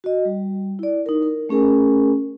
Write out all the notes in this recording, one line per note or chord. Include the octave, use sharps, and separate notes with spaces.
F#4 D#5
G3
E4 D5
D#4 A#4
A#4
A3 C#4 G#4 A#4 G#5